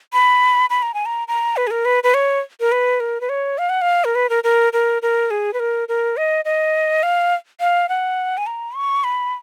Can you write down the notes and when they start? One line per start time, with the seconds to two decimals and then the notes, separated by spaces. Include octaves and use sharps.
0.13 B5
0.70 B5
0.82 A#5
0.94 G#5
1.06 A#5
1.28 A#5
1.57 B4
1.67 G#4
1.71 A#4
1.85 B4
2.04 B4
2.14 C#5
2.60 A#4
2.72 B4
3.00 A#4
3.21 B4
3.29 C#5
3.58 F5
3.69 F#5
3.82 F5
4.05 A#4
4.15 B4
4.30 A#4
4.44 A#4
4.73 A#4
5.02 A#4
5.31 G#4
5.53 B4
5.60 A#4
5.88 A#4
6.17 D#5
6.45 D#5
7.03 F5
7.60 F5
7.89 F#5
8.38 G#5
8.47 A#5
8.75 C#6
9.04 B5